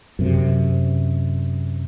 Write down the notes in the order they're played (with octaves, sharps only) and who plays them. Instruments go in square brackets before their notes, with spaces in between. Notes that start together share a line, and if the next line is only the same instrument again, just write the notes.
[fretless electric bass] F#2 C3